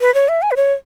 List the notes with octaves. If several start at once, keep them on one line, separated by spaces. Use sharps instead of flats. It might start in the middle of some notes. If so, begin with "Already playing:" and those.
B4
C#5
E5
G#5
B4
C#5